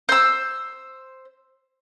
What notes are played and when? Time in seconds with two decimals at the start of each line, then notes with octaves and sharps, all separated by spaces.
0.09 C5 E6